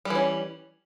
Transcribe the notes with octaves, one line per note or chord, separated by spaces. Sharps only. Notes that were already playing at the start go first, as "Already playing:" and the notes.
E3 G3 C#4